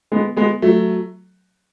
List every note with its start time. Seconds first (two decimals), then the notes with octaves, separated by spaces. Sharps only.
0.12 G#3 B3
0.37 G#3 B3
0.62 F#3 A3